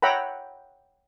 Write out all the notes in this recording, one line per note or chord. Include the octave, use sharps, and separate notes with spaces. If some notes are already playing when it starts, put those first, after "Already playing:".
C#5 E5 F#5 G5 A#5 B5